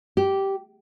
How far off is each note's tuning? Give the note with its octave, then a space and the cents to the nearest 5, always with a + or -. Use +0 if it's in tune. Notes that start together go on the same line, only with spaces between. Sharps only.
G4 -10